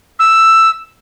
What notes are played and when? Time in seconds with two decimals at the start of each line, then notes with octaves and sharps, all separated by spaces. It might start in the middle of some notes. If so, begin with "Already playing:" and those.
0.19 E6